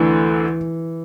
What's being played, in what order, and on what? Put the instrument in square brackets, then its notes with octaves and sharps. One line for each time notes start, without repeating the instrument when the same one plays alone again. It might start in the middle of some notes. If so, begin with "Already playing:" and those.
Already playing: [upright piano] D2 D3 D4 [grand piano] E3